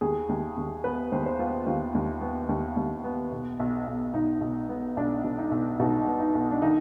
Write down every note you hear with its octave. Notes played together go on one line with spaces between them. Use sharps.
D#2 G#4
D#2
D#2
B3 B4
D#2 C5
C5
B3 F4
D#2 F4
D#2
B3
D#2
D#2
B3
B1
B1
B1
B1 D#4
B1
B3
B1 D4
B2
D#4
B1
B2 D#4
B3
D#4
B1
D4
D#3 D#4